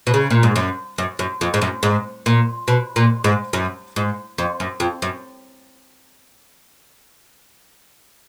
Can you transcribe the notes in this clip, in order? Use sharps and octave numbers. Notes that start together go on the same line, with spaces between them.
B2
C#3
A#2
G#2
F#2
F#2
F#2
F2
G#2
F#2
G#2
A#2
B2
A#2
G#2
F#2
G#2
F2
F#2
F2
F#2